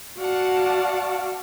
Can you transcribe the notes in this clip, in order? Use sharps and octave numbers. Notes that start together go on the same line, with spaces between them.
F#4 D5 F5 F#5 A5